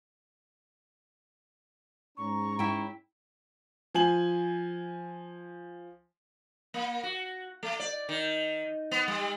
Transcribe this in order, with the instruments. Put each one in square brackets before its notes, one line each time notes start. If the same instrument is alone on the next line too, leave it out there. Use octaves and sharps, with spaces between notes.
[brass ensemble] G#2 C#4 A#5 [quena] C#6
[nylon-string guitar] E4 G5
[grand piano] F3 G#5 F#7
[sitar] A#3
F#4
A3
D5
D#3
B3
G3